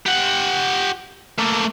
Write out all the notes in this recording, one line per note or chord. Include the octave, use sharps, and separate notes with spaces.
G4 F#5
A3 A#3